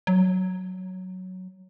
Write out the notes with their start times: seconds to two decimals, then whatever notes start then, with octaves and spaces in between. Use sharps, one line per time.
0.07 F#3